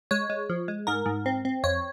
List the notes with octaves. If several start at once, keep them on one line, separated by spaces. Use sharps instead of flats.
G#3 C#5
G#3
F3
G#3
G#2 A#4
G#2
C4
C4
F2 C#5